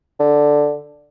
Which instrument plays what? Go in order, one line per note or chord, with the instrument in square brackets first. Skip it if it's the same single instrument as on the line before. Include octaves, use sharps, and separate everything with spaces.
[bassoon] D3